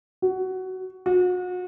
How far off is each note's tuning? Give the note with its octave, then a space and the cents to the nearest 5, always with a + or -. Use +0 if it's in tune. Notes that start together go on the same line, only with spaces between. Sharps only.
F#4 +15
F#4 -35